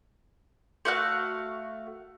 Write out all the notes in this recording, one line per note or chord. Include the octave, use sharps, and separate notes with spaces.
A3 F#4 F5 F#6